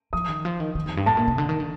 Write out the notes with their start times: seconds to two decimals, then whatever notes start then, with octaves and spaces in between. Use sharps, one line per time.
0.13 F3 D#6
0.28 D#3
0.45 F3
0.60 D#3
0.75 D#3
0.86 F2
0.97 G2
1.06 A2 A5
1.17 A#2
1.28 C3
1.38 D3
1.49 D#3
1.60 D3